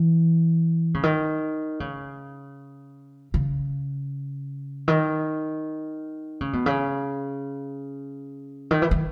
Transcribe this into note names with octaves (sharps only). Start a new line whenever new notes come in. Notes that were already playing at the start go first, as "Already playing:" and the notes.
Already playing: E3
C#3
D#3
C#3
C#3
D#3
C#3
B2
C#3
D#3
E3
D#3